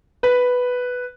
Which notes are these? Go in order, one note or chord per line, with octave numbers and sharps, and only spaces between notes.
B4